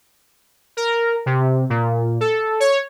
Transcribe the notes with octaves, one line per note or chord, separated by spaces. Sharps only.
A#4
C3
A#2
A4
C#5